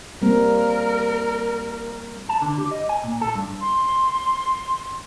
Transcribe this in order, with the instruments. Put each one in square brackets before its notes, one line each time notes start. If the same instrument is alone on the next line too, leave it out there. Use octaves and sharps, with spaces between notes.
[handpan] G3 A#3 C4 [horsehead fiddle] A#4
[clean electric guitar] A5
D3
G4
D#5
G#5
A#2
A4
G2
[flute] C6